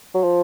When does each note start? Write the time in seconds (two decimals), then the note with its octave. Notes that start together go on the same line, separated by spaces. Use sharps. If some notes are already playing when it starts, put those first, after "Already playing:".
0.15 F#3
0.24 F3